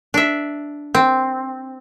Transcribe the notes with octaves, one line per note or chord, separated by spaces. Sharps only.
D4 E5
C4